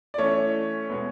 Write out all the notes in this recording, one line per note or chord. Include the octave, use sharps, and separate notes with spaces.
D5
E3 A3 C#4 C#5
B2 G#3 B3